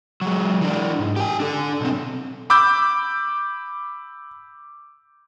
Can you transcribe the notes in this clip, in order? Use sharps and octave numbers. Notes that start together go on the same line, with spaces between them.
F#3 G#3
E3 D4
G#2
G4 G#5
D4 A4
B1 C4
B5 D6 E6 G6